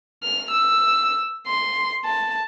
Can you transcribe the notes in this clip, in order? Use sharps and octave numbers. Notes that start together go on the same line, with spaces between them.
F6
E6
C6
A5